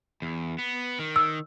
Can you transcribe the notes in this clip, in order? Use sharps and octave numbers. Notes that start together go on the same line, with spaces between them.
E2
B3
D#3
E6